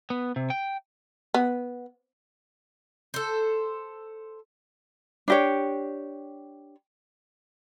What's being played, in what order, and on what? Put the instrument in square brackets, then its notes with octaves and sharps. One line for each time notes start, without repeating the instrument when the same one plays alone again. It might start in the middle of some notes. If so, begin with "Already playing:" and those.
[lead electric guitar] B3
C3
G5
[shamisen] B3
[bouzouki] A4 C5
[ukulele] D4 G4 C#5